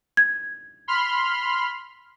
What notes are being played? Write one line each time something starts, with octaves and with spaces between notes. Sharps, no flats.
G#6
B5 C6 F6